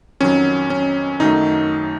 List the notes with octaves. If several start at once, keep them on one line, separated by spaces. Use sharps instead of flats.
F2 D#3 F#3 C#4
C#4
F#2 D#3 F#3 A3 D#4